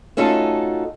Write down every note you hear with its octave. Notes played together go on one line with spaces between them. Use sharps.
A3 C#4 D#4 F4 F#4 A4